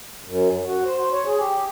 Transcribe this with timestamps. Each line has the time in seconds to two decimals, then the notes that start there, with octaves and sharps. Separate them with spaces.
0.24 F#2
0.65 F#4
0.85 C5
1.12 C#5
1.26 G#4
1.38 G4